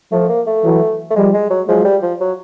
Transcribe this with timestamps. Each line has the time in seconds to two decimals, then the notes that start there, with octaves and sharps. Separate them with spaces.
0.12 F3 A3
0.29 A#3
0.47 A3
0.64 E3 F#3
1.10 A3
1.16 F3 G3 G#3
1.33 G#3
1.50 F#3
1.68 F3 F#3 G#3
1.84 G3
2.02 F3
2.20 F#3